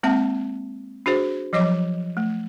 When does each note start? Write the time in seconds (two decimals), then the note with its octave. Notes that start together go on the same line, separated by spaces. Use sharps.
0.03 G#3 A#3 C4 E5 A5
1.06 D4 F#4 G#4 C5
1.53 F3 F#3 C#5 D#5 D6
2.17 A3